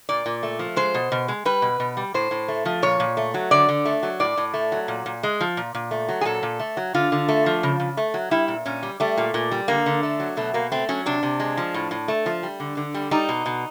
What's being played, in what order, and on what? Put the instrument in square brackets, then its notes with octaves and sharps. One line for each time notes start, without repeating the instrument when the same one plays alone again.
[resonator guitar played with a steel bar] A#2 D5
A#2
A3
F3
G#3 C5
B2
B2
G#3
G3 B4
B2
B2
G3
A2 C5
A2
A3
F3
A#2 C#5
A#2
A3
F#3
D3 D5
D3
A3
F#3
A2 D5
A2
A3
F#3
A#2
A#2
G#3
F3
A#2
A#2
A3
F#3
G#4
A#2 A4
A#2
A3
F#3
D3 F4
D3
A3
F3
C#3
C#3
A3
F#3
G3 E4
A#2
A#2 C#4
G3
G3 A3
A#2
A#2
G3
D3 A#3
D3
A3
F#3
B2 A3
B2 A#3
A3 C4
F#3 C#4
C3 D4
C3
G#3
F3
A2
A2
A3
F3
G3
D3
D3
G3
G3 D#4
B2
B2